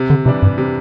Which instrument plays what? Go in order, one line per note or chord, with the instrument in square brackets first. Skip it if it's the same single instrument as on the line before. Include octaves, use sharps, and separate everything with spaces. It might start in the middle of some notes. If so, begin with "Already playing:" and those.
Already playing: [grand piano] C3
[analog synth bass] D3
[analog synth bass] C3 [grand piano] E3 G3 D4
[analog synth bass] G2
[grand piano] C3